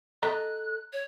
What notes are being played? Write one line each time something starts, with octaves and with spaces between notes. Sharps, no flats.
A4 D#5 A#5 F#6
C#5